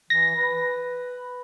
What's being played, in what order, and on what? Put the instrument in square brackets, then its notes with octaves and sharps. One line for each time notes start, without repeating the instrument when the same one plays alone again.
[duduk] E3 [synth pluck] A#6
[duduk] B4